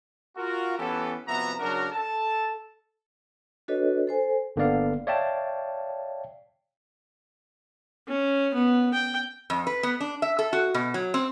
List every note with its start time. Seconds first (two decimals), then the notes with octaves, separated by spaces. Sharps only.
0.37 F4 F#4 A#4
0.78 E3 B3 C#4 G4 A4
1.27 C2 F2 B3 F#4 E5 A#5
1.60 C#3 F#3 D4 F#4 A#4
1.93 A4 A5
3.68 D4 F#4 A4 B4 C#5 D#5
4.07 A4 C5 G#5
4.56 G1 D3 A#3 B3 D5 F5
5.07 C#5 D5 E5 F5 G5 A5
8.08 C#4
8.54 B3
8.94 G5
9.50 F2
9.67 B4
9.83 B3
10.00 D4
10.22 E5
10.39 A4
10.53 F#4
10.74 B2
10.94 F#3
11.14 C4